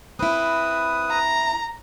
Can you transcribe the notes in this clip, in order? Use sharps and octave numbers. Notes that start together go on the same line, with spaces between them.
C4 E4 B4 D#6
A#5